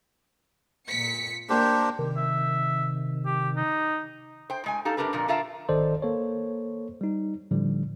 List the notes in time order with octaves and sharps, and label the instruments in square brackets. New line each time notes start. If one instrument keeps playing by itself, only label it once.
[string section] A#2 B6 C#7
[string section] A#3 [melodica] D4 G4 C5
[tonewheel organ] C3 D#3
[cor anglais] E5
G4
D#4
[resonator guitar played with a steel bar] C5 G5
A2 G#3 G#5
D#4 G4 A4 F5
F#2 F#3 D4 G4 A#4 B4
F2 A#2 D3 F3 A#3
D3 F4 A#4 E5 F5 A5
[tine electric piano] G#1 D#3 A4 C5 D5 D#5
A#3 A4 C5 C#5
G3 D#4
A2 D3 F3 G3